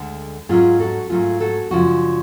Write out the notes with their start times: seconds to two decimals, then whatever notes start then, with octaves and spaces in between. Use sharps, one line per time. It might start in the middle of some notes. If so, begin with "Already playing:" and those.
Already playing: D2 D3 G#3
0.49 G#2 F#3 A3 C#4 F4 G#4
0.79 F#4 A4
1.10 G#2 F#3 A3 C#4 F4 G#4
1.40 F#4 A4
1.71 F#2 C#3 F3 G#3 D4 F#4